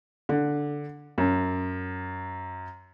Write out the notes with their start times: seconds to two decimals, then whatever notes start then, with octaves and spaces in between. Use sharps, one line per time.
0.29 D3
1.18 F#2